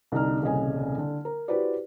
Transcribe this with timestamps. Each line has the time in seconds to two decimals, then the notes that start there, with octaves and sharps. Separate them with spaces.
0.12 C2 D3 D#4 F6
0.42 D#1 C2 C#3 D#5 G#5
0.98 D3
1.25 A#4
1.48 E4 F#4 G4 B4 C5 D5